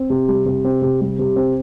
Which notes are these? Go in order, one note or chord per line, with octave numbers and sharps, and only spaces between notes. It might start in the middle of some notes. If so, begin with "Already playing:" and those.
Already playing: C4
C3
G3
C3
C4
C3
G3
C3
C4